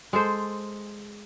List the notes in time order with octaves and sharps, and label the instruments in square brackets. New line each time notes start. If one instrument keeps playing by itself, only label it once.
[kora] G#3 A4 C5